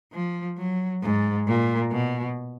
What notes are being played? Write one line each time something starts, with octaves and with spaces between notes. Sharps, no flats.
F3
F#3
G#2
A#2
B2